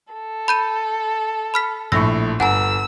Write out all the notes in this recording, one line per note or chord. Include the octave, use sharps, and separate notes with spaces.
A4
B5 G6 D#7
B5 F6 B6
A#1 A2 C#6 E6 A#6
G1 F#5 G#5 A#5 E6